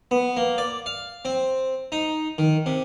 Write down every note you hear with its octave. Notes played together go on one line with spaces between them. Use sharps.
B3
A#3
D5
F5
C4
D#4
D#3
C3